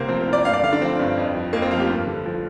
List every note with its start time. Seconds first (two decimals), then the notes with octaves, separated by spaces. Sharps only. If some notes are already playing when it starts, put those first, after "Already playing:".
Already playing: C2 C3 A#3 C5
0.08 F3 C4
0.21 A#4
0.28 C2
0.33 D5
0.45 G2 F5
0.53 D5
0.63 D3 F5
0.73 D4
0.81 F3 C4
0.99 G2
1.17 F2
1.35 F3
1.53 F2 A#3
1.62 C4
1.71 F3 F4
1.80 G4
1.90 G2
2.07 D3
2.26 F3